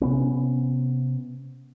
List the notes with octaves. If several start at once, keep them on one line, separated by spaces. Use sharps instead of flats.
C3 B3 C#4